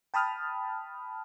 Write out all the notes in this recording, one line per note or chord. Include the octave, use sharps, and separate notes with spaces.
G5 A5 B5 D#6 F6